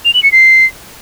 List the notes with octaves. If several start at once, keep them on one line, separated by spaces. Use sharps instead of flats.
F7
F#7
C#7
C7